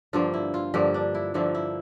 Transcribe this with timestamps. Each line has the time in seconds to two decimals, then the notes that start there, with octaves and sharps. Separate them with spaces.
0.13 G2 D3 F3 A#3 F4
0.34 E4
0.54 F4
0.74 G2 D3 F3 A#3 G4
0.94 D4
1.15 E4
1.34 G2 D3 F3 A#3 E4
1.55 E4